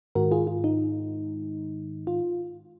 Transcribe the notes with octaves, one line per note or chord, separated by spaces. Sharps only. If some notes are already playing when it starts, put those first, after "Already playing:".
G#2 D#3 G#3 F#4 A#4
F4 G#4
F4
D#4
F4